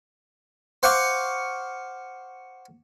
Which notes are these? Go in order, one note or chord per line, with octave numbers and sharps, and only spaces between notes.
C5 F5 F#5 C#6 D6